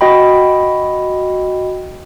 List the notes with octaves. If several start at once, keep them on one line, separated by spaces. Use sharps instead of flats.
F#4 D#5 G5 B5